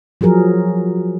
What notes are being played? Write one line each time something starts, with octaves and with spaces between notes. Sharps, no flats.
F3 F#3 G#4 A#4